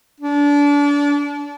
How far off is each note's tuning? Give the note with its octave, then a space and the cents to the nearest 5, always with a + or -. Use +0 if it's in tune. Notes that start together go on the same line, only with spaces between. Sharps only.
D4 -30